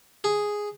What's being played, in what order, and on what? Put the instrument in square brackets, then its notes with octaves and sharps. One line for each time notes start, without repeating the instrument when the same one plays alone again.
[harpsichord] G#4